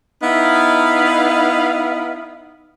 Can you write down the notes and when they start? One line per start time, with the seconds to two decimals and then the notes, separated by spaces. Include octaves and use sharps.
0.23 B3 D#4 E4 F5